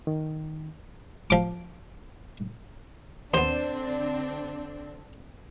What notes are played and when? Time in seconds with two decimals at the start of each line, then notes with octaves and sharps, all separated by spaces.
0.07 D#3
1.30 F3 D6
3.34 D#2 D3 B3 C4 D4 C5